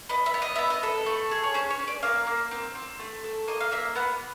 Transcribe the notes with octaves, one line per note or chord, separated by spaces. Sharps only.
B3 D#5
E5
B3
D#5
B3 E5
D#5
A4
A3
G#4
C#5
C#4 C5
C#5
C#4
D5
A#3 F5
A#3
C4
C4
A3
A4
A#3 D#5
F5
A#3 E5
B3 F#5